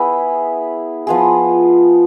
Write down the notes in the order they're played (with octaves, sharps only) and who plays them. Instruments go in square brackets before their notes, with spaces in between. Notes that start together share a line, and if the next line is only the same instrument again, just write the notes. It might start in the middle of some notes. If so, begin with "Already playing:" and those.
Already playing: [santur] B3 E4 G#4 B4
F3 B3 F4 G#4